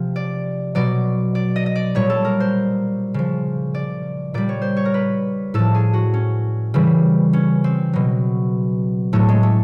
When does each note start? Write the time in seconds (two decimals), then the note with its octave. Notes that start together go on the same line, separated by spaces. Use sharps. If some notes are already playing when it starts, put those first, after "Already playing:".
Already playing: C3 F3
0.16 D5
0.75 B2 F#3 D5
1.35 D5
1.56 D#5
1.66 D#5
1.75 D5
1.95 A#2 G3 C#5
2.10 A4
2.25 A#4
2.40 C5
3.14 C#3 F3
3.74 D5
4.34 A#2 G3 D5
4.49 C#5
4.62 C5
4.77 C#5
4.85 A#4
4.94 B4
5.54 A2 F3 A4
5.75 G#4
5.93 F#4
6.14 C#4
6.74 C#3 E3 G3
7.33 C#4
7.64 C4
7.93 B2 F#3
9.13 A2 F#3 A3
9.29 G#3
9.43 A3